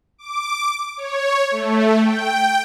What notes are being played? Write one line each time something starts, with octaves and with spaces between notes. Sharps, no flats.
D6
C#5
A3
G5